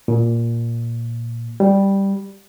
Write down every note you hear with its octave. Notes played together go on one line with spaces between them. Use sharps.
A#2
G3